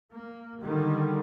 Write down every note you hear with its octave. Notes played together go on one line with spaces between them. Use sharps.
A#3
D3 D#3 G3